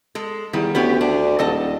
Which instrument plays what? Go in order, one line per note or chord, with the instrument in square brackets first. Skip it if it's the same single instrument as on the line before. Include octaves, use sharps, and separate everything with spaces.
[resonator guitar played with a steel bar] G#3 A4
[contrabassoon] E2 [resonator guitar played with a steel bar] D#3 G3
[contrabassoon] D2 [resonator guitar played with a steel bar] B3 C#4 G4
[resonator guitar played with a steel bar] D4
[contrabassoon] D#1 [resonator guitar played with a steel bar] A4 D#5 A5